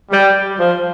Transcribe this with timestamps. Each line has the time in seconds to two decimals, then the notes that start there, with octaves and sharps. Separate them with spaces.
0.11 G3
0.59 F3